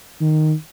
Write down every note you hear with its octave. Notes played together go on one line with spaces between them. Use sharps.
D#3